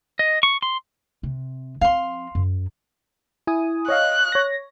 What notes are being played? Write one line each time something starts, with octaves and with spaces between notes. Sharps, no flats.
D#5
C#6
C6
C3
F3 C4 F5 C6
F#2
E4 G#5 D#6
C#5 D#5 F5 F#6
C#5 A#6